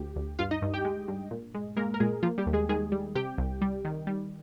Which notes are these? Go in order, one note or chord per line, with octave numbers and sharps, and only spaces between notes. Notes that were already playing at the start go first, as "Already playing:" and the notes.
Already playing: D2 G4
D2
G2 F4 F5
D#4 D#5
G2
G4 G5
G#3
G2
A#2
G#3
G#3 A#3 A#4
A#4
A#2 G#3 G#4
F3 A#3 F4
G3 G4
D#2
G#3 G#4
D#3 G#3 G#4
G3
C3 G4 G5
C2
G3
D#3
G3